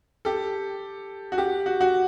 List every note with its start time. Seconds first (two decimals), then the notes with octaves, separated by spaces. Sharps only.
0.25 G4 A4
1.32 F#4
1.38 G4
1.66 F#4
1.81 F#4